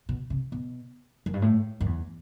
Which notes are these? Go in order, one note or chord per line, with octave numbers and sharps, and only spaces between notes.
B2
C3
B2
F#2
G2
A2
F#2
E2